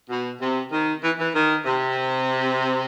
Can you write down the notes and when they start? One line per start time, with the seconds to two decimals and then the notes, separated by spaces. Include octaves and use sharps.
0.09 B2
0.40 C3
0.72 D#3
1.03 E3
1.18 E3
1.34 D#3
1.65 C3